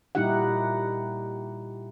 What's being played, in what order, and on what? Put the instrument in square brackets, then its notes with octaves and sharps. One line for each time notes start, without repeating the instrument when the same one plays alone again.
[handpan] A#2 G3 D#4 E4 G4 F#5